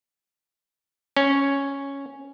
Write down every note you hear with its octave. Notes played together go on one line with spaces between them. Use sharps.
C#4